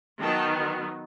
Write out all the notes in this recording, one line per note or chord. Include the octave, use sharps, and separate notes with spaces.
D#3 F#3 B3 G5 A5